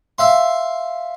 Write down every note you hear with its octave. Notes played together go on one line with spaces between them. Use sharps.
E5 F5 C6